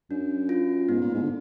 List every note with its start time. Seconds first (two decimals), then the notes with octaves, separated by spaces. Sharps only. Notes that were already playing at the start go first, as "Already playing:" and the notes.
0.10 F#2 D4
0.49 F4
0.89 G#2 B3
1.01 A#2
1.14 G#2
1.23 D3